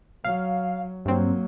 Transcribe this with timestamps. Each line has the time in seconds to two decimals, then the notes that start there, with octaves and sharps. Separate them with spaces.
0.24 F#3 F5
1.05 G2 F#3 A#3 C4